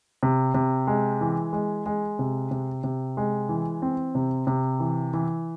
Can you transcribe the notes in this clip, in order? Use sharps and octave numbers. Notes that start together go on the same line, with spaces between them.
C3
C3
G#3
E3
G#3
G#3
C3
C3
C3
G#3
E3
C4
C3
C3
E3
E3